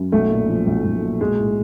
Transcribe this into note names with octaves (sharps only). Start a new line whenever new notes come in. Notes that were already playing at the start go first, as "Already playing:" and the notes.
Already playing: F#2
B1 A3
A#2
F3
B1
B1
A#2
B1 G#3
A2